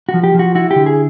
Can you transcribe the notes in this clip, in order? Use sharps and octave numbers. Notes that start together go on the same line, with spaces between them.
F#4
F3
G4
F3 F#4
E4 F#4
G4
D3
G#4